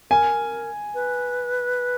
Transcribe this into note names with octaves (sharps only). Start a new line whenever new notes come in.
A#4 G#5
B4